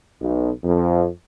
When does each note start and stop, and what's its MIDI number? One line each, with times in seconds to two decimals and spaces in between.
0.21 0.50 35
0.64 1.08 41